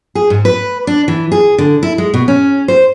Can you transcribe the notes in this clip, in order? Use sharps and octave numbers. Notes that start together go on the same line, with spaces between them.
G#4
G#2
B4
D4
E3
G#4
D3
E4
G#3
B2
C#4
C5